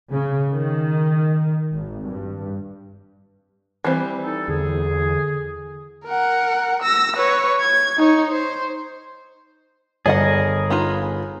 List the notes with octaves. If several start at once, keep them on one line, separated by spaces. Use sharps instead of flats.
C#3
D#3
G#1
G2
E3 G3 C4
D#4 A4
E2 D3 G#4
A#4 F#5
E6 A#6
B4 C#5
G#6
D#4 C#5
C5
G1 G#4 A#4 D5 D#5 F#5
B3 D#4 F4